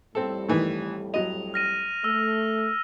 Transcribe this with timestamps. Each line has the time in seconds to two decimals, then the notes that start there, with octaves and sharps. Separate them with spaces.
0.15 F2 A2 G3 C4 A4
0.48 D#3 E3 A3
1.14 F#3 D#5 F7
1.54 F6 A#6 D#7
2.04 A3 E6